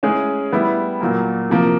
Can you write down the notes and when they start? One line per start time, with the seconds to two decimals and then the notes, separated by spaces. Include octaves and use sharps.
0.03 G#3 C#4 E4 G#4
0.52 G3 B3 E4 G4
1.01 A#2 F#3 A#3
1.50 C3 F3 A#3